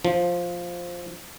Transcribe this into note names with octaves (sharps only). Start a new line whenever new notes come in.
F3